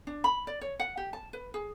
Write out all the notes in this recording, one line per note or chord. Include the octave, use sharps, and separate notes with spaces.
D4
B5
D5
C#5
F#5
G4
A5
B4
G#4